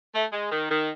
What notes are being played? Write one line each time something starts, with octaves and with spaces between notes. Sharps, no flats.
A3
G#3
D#3
D#3